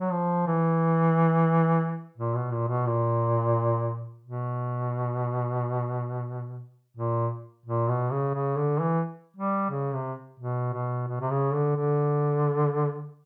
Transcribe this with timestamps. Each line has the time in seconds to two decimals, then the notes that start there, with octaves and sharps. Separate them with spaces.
0.01 F#3
0.12 F3
0.47 E3
2.18 A#2
2.35 B2
2.52 A#2
2.69 B2
2.87 A#2
4.23 B2
6.97 A#2
7.66 A#2
7.88 B2
8.11 C#3
8.34 C#3
8.57 D3
8.80 E3
9.37 G3
9.71 C#3
9.94 C3
10.40 B2
10.74 B2
11.08 B2
11.21 C3
11.31 C#3
11.54 D3
11.76 D3